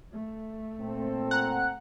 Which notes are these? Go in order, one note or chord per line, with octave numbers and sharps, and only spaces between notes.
A3
A#2 C4 A4
F#5 A#5 F#6